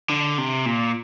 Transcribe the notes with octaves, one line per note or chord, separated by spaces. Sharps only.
D3
C3
A#2